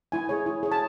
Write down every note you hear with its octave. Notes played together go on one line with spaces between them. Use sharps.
E4 G#5
G#4 C#5
E4
G#4 C#5
A5